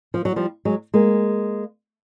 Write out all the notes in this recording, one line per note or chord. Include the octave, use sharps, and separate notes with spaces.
F3
F#3
F3 G3
F#3 G#3
G#3 A#3